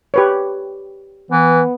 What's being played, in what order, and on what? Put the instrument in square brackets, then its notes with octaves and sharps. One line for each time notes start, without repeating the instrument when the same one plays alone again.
[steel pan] G4 B4 C#5
[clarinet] E3 [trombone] B3